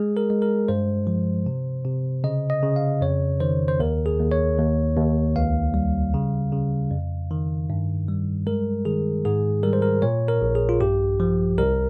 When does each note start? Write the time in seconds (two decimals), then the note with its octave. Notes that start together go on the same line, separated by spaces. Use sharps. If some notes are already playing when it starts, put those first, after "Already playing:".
Already playing: G#3 G#4
0.17 A#4
0.30 G#3
0.42 A#4
0.68 G2 C5
1.07 F3
1.46 C3
1.84 C3
2.24 C#3 D#5
2.50 D#5
2.63 C#3
2.76 F5
3.01 F2 C#5
3.40 D#3 C5
3.68 C5
3.80 D#2 A#4
4.06 G#4
4.19 D#2
4.32 C#5
4.58 D#2
4.97 D#2
5.36 C#2 F5
5.74 G3
6.14 C#3
6.52 C#3
6.91 F2
7.31 D#3
7.70 G2
8.08 G3
8.47 G#3 A#4
8.85 D#3 G#4
9.25 G#2 G#4
9.63 G3 A#4
9.73 C5
9.82 A#4
10.02 A#2 C#5
10.28 A#4
10.42 A#1
10.55 G#4
10.69 F4
10.81 G2 G4
11.20 F3
11.58 C2 A#4